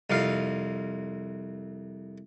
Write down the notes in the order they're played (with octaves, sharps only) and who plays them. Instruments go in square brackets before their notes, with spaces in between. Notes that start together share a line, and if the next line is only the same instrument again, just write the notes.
[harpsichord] C2 F2 F5